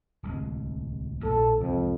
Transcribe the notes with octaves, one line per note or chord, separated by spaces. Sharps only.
D1 C2 G#3
A#1 A#2 A4
C2 F2 F3 G#3